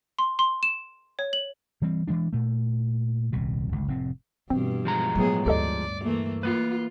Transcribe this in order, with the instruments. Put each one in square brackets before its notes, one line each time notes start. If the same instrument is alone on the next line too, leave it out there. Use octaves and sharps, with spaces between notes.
[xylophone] C6
C6
E7
C#5
F#7
[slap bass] E3 G3 C4
E3 F#3 G#3 D4
A#2 A3
D#1 C2 B2
G1 C#2
F1 A2 C4
[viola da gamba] G2 B2 [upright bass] E3 [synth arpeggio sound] C4
[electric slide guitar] F3 G#3 A#5
[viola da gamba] A2 B3 G#4 [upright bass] F#3 G3
[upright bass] D2 G2 [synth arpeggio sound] G4 A4 D#5 [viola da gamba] D5
[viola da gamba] E3 A3 A#3
[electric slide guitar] A#3 B4 [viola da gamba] F4